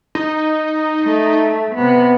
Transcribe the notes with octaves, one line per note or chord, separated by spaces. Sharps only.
D#4
A3
C3 B3